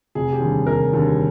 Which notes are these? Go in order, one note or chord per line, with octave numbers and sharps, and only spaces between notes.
F1 G#4
G4
D#2 D3 G3
F1 A#4
D#2 D3 G3